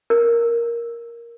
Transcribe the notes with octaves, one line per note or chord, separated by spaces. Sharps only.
A#4